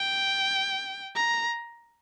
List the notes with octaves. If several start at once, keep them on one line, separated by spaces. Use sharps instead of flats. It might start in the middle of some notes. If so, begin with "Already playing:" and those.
Already playing: G5
A#5